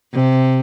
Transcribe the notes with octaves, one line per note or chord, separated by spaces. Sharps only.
C3